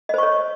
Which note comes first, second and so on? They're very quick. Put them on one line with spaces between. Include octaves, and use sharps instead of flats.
D#5 C5 C#6 C#5